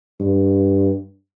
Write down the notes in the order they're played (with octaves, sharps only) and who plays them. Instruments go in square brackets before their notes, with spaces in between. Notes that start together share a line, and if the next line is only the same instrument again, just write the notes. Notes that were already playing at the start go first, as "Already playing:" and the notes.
[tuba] G2